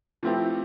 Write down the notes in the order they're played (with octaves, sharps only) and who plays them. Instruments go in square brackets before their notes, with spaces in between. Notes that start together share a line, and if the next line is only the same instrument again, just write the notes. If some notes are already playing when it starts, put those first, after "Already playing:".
[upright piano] F3 A3 C4 E4 G4